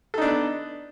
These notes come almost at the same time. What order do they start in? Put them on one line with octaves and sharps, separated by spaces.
A4 D#4 D4 B3